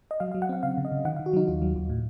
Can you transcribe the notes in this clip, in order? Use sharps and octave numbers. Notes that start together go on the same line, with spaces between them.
D#5
F#3 F5
F5
F#3
F#5
C4 F5
C#3 F5
C#3
D#5
C#3
D#3 F#5
F5
D#3
F#4
F#3 D#4
D#2 F4
F#3
D#2
A2